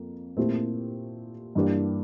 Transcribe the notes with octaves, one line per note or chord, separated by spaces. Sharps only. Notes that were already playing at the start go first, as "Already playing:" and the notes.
Already playing: F2 A#3
A#2 A3 C4 E4 G4
G2 E3 A#3 D4 G4